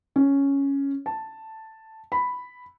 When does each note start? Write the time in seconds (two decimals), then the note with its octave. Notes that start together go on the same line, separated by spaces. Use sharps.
0.16 C#4
1.06 A5
2.12 B5